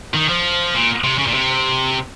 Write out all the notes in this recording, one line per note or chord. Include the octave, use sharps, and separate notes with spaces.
D#3
F3
A#2
C3
C#3
A#2
C3